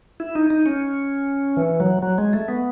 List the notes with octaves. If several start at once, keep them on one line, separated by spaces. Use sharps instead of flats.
E4
D#4
D#4
C#4
E3
F#3
F#3
G#3
A3
B3